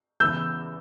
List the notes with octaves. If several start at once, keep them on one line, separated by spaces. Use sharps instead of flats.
E2 C#3 E3 E6 G6